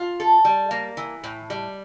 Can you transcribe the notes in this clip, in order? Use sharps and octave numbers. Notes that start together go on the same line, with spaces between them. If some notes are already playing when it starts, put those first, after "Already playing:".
Already playing: F4
A4
G3
A#3
E3
A2
G3